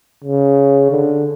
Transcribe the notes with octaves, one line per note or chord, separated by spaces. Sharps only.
C#3
D3